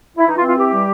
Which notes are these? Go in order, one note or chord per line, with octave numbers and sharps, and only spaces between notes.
E4
E3 D#4
F4
C4
F4
E3 G4
G3